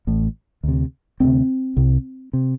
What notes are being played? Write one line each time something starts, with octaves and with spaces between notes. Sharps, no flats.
A1 A2
D2 C3
D2 C3 C4
C2 C3
C3